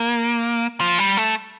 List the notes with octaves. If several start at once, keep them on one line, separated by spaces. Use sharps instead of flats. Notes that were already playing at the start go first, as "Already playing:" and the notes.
Already playing: A#3
F3
G3
A3